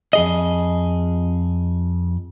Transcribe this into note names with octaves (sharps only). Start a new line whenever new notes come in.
F2 G#4 D#5